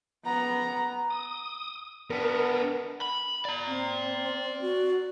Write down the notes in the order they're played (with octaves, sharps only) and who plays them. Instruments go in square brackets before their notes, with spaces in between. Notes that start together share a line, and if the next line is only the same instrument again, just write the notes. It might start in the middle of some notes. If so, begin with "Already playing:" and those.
[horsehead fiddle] B3 A#5
[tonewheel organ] D#6
[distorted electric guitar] B3 D4 [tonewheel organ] A#4
[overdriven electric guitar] B5
D5 A#5
[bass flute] C4
F#4